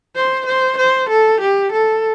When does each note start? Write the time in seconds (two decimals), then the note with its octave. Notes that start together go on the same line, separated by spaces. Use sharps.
0.16 C5
0.46 C5
0.78 C5
1.09 A4
1.41 G4
1.72 A4